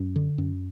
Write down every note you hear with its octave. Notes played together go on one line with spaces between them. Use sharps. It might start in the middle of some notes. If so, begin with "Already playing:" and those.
Already playing: F#2
D3
F#2